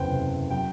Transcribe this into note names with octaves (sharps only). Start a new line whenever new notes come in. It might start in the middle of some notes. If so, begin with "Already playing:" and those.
Already playing: F#1 E2 C3 F#3 B4 C5 G5
F#3 G5